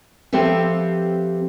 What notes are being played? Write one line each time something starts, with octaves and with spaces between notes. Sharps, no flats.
F3 C4 G4 A4 B4 E5